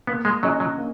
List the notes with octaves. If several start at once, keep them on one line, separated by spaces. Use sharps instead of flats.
A#3 B3
G#3
F#3 C#4 G#4 D#5
F#3
A#3